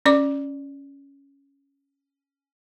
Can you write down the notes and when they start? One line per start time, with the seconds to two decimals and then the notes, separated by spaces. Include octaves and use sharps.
0.06 C#4 D5 D6